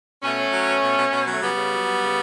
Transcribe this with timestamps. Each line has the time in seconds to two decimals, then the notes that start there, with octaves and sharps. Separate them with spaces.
0.23 B2 A3 C#4
0.38 F#3
0.52 F#3
0.68 B2
0.83 B2
0.97 B2
1.12 B2
1.27 F#3 A3
1.42 C#3 G3 B3
1.57 C#3
1.72 F#3
1.87 F#3
2.02 C#3